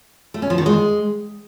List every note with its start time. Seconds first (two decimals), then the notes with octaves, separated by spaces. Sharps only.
0.34 A3
0.42 C#4
0.50 F3
0.58 D#3
0.66 G#3